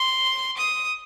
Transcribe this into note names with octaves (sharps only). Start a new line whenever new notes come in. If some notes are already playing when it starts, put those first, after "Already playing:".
Already playing: C6
D#6